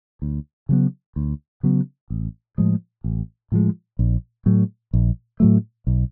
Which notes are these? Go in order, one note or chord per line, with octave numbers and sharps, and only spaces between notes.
D2
C#3 F#3 B3
D2
C#3 F#3 B3
A1
A2 F3 G#3
A1
A2 F3 G#3
A#1
A2 F#3 A3
A#1
A2 F#3 A3
B1